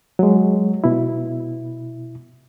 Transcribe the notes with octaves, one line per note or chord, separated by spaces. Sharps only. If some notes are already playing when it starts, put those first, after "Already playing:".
F#3 G#3
B2 E4